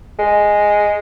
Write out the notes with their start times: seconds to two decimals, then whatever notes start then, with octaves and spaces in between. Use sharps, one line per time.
0.19 G#3